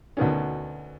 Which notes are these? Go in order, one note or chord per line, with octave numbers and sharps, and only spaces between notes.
D2 B2 D#3 C#4